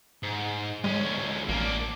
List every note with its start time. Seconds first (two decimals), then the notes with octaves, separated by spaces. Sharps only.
0.23 G#2
0.84 D2 G#3 C#4
1.49 A1 A#3 D4